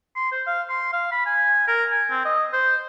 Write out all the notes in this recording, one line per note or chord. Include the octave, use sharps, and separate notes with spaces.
C6
C5
F5
C6
F5
B5
G#5
A#4
G#5
C4
D#5
C5